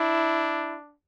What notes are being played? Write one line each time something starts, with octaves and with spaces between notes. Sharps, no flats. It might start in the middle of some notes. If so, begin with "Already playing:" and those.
Already playing: D4 E4